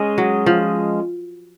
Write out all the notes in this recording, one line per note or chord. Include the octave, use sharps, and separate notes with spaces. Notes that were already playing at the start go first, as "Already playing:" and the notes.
Already playing: G#3 C#4 G#4 D#5
F#3
F3